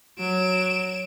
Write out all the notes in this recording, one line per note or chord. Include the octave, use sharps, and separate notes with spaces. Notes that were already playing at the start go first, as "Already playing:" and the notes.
F#3 D7 E7